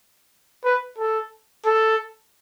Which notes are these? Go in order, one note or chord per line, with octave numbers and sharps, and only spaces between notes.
B4
A4
A4